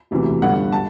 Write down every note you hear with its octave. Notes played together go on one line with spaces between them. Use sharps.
E1 D2 C3 E3
G1 G2 D3 F#5
A5